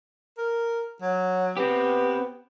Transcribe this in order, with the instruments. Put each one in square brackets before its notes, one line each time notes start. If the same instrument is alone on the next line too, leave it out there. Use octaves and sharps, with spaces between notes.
[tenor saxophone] A#4
F#3
[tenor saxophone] B3 [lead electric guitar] C4 G4